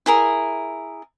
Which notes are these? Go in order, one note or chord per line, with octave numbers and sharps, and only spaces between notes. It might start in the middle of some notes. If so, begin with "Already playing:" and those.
E4 G#4 A#4